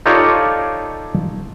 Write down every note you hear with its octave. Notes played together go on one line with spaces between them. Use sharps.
D#4 F4 G4 A4 C#5 D5